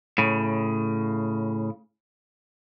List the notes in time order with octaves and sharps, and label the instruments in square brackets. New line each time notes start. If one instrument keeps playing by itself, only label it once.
[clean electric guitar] A2 C#3